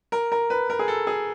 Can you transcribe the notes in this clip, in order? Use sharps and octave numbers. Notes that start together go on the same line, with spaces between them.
A#4
A#4
B4
A#4
G#4
A4
G#4